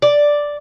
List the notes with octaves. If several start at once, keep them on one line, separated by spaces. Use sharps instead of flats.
D5